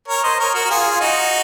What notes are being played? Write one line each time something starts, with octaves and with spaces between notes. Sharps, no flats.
A#4 C#5
C5 D#5
A#4 C#5
F#4 A#4
F#4
F4 G#4
F4
D#4 F#4